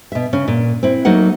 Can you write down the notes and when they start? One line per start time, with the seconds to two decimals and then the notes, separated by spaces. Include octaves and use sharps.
0.12 B2 E5
0.33 C#3 C#4
0.48 A#2
0.83 C4 E4
1.05 F#3 A3 A#3 D#4 F#5